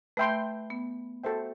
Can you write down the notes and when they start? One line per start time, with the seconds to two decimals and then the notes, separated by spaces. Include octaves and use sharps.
0.17 A3 B4 E5 G5 C6
0.70 B3
1.24 F#4 A4 C5 E5 G5